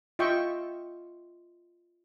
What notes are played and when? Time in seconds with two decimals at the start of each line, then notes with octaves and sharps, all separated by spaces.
0.19 F4 D#5 E5 G5 C#6